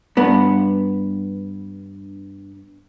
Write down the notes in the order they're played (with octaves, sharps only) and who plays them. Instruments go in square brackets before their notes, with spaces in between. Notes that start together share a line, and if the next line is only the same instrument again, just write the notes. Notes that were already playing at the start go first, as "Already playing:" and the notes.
[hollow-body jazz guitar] G2 B3